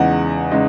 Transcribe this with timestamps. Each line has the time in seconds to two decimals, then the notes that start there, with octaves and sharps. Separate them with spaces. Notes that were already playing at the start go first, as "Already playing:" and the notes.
Already playing: E2 C#3 G#3 D#4 F#5
0.51 C#3 G#3 D#4